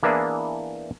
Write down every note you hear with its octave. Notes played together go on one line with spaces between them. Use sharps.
E3 A#3 B3 D4 E4 G#4